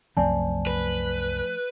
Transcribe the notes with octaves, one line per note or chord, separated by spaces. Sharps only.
C2 F#2 F3 A3 C4 D5 G#5 A5
B4